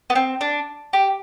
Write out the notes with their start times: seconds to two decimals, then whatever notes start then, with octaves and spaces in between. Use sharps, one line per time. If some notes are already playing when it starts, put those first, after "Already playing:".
0.10 B3
0.15 C4
0.41 D4
0.93 G4